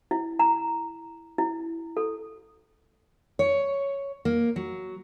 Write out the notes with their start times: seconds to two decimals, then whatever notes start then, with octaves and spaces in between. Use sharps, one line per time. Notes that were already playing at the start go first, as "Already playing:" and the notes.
0.11 E4
0.39 A#5
1.38 E4
1.97 A4
3.39 C#5
4.25 A#3
4.56 F#3